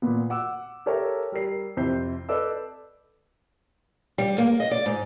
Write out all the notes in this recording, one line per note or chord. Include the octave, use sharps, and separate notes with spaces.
A#2 B3
F#5 D6 E6
G4 A4 A#4 C#5 E5
G3 A#4 D5 C7
F2 C3 C4 E4 G6 C7
A4 B4 D5 D#5 D6 E6
G3
A#3
D#5
D5
G#2